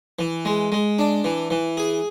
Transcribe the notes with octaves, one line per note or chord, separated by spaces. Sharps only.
E3
G#3
G#3
D4
E3
E3
G#4